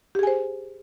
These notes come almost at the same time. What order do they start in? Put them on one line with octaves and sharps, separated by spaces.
G4 G#4 G#5 C5